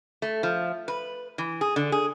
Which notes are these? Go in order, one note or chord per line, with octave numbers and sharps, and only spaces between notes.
A3
F3
B4
E3
G#4
D3
G#4